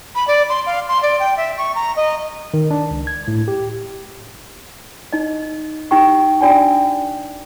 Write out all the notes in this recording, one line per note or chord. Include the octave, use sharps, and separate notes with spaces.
B5
D5
C6
F5
C6
D5
G5
E5
C#6
A#5
D#5
D#3
D4
C#2
G#6
A2
G4
D#4 D#5
D#4 G4 G5 C#6
D4 F#4 D5 G5 G#5